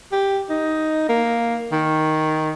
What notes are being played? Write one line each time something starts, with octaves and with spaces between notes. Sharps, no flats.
G4
D#4
A#3
D#3